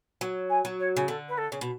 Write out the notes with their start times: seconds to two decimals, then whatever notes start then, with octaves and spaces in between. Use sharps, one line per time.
0.21 F#3
0.50 G#5
0.65 F#3
0.80 C#5
0.96 C#3
1.08 D3 A4
1.29 B4
1.38 A4
1.52 C#3
1.61 B2